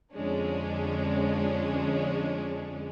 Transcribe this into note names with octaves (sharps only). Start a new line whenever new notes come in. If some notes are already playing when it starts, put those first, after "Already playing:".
F2 D3 F3 G#3 C#4 D4